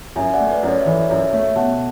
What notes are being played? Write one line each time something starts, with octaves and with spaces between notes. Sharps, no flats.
F#2 E5 G#5
D5 F#5
A3
B4 D5
F#2
A4 C#5
E5
E3 B4 D5
F#2 C#5 E5
A3 C#5 E5
B2 F#5 A5